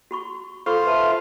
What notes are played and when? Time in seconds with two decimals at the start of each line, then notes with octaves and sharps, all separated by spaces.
0.11 F#4 B5 C#6
0.66 F4 A4 C5 B5 C#6
0.85 B4 E5 A5 B5